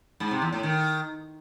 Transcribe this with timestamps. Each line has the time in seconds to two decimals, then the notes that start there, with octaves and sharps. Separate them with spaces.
0.20 G#2
0.31 C3
0.42 E2
0.53 A2
0.63 D#3